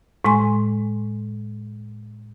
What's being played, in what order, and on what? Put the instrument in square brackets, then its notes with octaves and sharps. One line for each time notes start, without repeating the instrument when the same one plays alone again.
[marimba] A2 G#3 G#5 C6